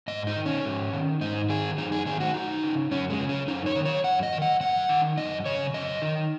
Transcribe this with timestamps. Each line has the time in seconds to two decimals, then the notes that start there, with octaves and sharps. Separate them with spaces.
0.08 G#2 D#5
0.27 D#4
0.36 D#3
0.46 C#4
0.65 G#2
0.93 D#3
1.21 G#2 D#4
1.49 D#3 G#4
1.78 F#2 D#4
1.92 G#4
2.06 D#3 G#4
2.20 F#4
2.34 F#2 D#4
2.63 C#3
2.91 F#2 C#4
3.10 G#3
3.19 C#3
3.29 C#4
3.48 F#2 D#4
3.66 C#5
3.76 D#3
3.85 C#5
4.04 F#2 F#5
4.23 D#5
4.33 D#3
4.42 F#5
4.60 F#2 F#5
4.89 D#3
5.17 F#2 D#5
5.46 C#3 C#5
5.74 F#2 D#5
6.02 D#3